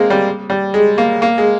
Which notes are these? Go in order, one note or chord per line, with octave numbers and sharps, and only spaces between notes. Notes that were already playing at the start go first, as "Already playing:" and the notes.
Already playing: G#3 A#3 C4
G3
G3
G#3
A#3
A#3
G#3